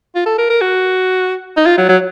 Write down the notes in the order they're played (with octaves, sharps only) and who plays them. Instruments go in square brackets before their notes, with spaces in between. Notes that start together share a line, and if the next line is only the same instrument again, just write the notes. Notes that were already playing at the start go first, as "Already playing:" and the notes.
[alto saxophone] F4
A4
A#4
A#4
F#4
D#4
F4
F#3
F#3